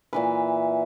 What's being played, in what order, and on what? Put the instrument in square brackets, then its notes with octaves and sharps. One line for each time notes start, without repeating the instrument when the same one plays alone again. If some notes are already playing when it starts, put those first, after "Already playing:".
[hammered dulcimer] A#2 E3 B4